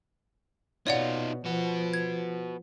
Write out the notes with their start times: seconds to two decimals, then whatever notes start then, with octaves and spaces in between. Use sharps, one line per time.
0.87 B2 D#4 F4 C#5 D5 F#5
1.45 F3 B3 F#4
1.94 G#6